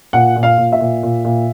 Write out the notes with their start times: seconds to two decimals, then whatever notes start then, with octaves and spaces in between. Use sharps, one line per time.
0.13 A#2 F#5
0.36 A#2
0.43 F5
0.58 A#2
0.72 E5
0.80 A#2
1.03 A#2
1.24 A#2